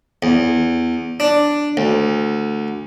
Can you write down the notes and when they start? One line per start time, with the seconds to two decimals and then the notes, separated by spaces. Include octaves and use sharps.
0.23 E2
1.20 D4
1.77 D2